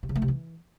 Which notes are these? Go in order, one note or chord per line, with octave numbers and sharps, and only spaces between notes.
C3
C#3
A3
C3
E3